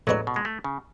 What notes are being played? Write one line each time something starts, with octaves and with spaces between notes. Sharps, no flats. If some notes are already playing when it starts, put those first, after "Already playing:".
A2 F#3 G#3 B3 D4
B2
G#3
A3
C#3